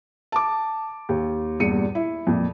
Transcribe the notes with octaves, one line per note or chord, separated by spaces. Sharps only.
A5 D6
D#2
E2 G2 A#2 C#7 D#7
E4
F2 A#2